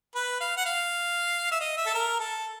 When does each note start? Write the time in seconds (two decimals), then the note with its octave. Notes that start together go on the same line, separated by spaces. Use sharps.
0.15 B4
0.40 F5
0.57 F#5
0.66 F5
1.51 E5
1.60 D#5
1.77 E5
1.86 A4
1.94 A#4
2.20 A4